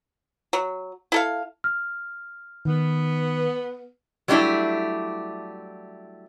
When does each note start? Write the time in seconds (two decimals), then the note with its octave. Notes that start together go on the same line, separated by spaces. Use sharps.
0.53 F#3
1.12 E4 A4 F5
1.64 F6
2.65 D#3 B3
4.28 F#3 G3 A3 D4 E4 D5